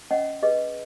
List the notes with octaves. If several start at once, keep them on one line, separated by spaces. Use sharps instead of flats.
C#4 D#5 F#5
G#4 B4 D#5